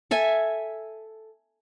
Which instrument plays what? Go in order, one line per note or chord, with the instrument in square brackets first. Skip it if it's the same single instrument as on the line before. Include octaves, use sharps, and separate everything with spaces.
[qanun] A4 E5 G#5